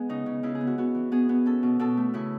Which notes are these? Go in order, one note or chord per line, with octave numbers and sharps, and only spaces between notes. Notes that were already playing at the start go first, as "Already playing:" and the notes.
Already playing: G#3 B3 G#4 F#5
C#3 D#4
C#3
C#3 E4
G#4
B3
F#4
B3 F#4
E3
B3 G#4
B3
C#4 A4
B2
B2 A4
A3
C#3 E4